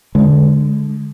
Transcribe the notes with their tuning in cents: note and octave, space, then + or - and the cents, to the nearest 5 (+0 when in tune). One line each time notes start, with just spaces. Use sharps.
D3 -15 G#3 +10